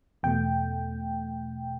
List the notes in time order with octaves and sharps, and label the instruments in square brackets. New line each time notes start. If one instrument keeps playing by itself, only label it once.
[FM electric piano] E2 B2 A3 G5